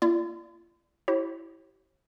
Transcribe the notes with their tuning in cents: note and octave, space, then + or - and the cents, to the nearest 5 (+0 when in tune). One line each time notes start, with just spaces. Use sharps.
A#3 +0 F4 -45 D5 +0
E4 +0 G4 -35 C#5 -45